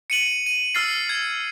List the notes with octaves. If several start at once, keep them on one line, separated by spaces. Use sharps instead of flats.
C#7 D#7 F#7
D#7
E6 F6 A6 C7
G#6